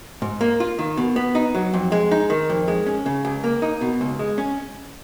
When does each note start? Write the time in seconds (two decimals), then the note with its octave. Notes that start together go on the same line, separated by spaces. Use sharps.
0.22 G#2
0.41 A#3
0.60 F4
0.79 D#3
0.97 B2
1.16 B3
1.35 D#4
1.55 F#3
1.73 F2
1.92 G#3
2.11 D#4
2.30 D#3
2.50 F2
2.68 G#3
2.87 C#4
3.06 C#3
3.25 C#2
3.44 A#3
3.62 D#4
3.81 B2
4.01 C#2
4.19 G#3
4.38 C#4